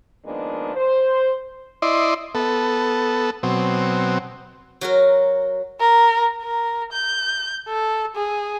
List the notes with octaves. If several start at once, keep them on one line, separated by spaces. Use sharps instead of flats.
D#3 F3 G#3 A#3 B3 D4
C5
E4 D5 D#5 C6
B3 A4
B2 F#3 C4
F#3 F#4 A#4
A#4
A#4
G6
A4
G#4